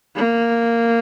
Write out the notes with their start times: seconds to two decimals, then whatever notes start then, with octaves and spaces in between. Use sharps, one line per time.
0.16 A#3